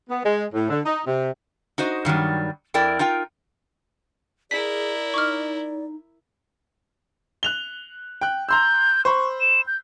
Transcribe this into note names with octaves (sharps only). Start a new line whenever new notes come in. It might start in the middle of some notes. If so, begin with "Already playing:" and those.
B3
G#3
A2
D3
D#4
C3
D#4 F#4 C5 D#5
G2 D#3 F#3 G3
F2 E4 A#4 D5 G5
D#4 F4 A#4 G5
E4 G#4 A#4 D5 B6
D#4 C#6 D6 F6
F#6 F7 G7
G5 F#6
A#5 C6 E6 G6
C5 B5 C#6
E7
G6